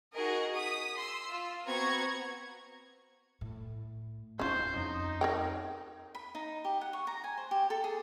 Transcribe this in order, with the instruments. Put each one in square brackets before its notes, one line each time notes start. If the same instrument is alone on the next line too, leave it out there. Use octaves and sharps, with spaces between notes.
[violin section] D#4 F#4 G#4 A#4 D#5
D#6 B6
C6 E6
F4
B3 C4 F#4 A#5 C#6 G#6
[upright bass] A2
[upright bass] D#2 E4 [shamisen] C#4 F4 [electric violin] C5
[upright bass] F2 [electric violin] D#4
[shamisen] A#4 C#5 G5
[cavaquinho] B5
D#4
G4
F#5
C#6
A#5
G#5
C5
G4
A4
G#4